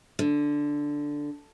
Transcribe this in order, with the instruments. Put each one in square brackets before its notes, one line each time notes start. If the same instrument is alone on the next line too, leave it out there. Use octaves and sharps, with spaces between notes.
[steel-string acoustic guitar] D3